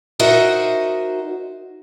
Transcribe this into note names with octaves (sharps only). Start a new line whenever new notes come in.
D#4 F#4 A#4 C5 D#5 E5